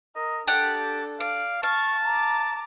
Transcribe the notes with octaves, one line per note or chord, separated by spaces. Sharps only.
A#4 D#5
D4 G4 A4 D5 F#5 A5
D5 F5
F5 A5 C#6
A#5 D6